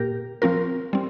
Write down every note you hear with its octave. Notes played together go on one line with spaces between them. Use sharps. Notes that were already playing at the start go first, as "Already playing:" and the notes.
Already playing: A#2 A#3 G4 A#4
F3 C4 F4 A#4
G3 C4